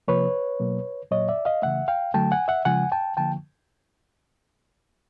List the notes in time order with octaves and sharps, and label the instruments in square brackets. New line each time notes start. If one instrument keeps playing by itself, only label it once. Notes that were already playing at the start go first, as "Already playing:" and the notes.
[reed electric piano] C3 F3 A#3 B4 C#5
B2 F#3 A#3
A#2 F#3 A#3 C#5 D#5
D5 E5
D#5 F5
C#3 E3 A3 E5 F#5
F5 G5
D3 F#3 A3 G5 A5
F#5 G#5
E5 F#5
C#3 F3 G#3 F#5 G#5
G5 A5
D3 F3 A#3 G5 A5